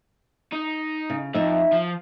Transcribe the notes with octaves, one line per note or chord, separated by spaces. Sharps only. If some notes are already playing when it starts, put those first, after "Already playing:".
D#4
C#3
F2 D#4 E5
F3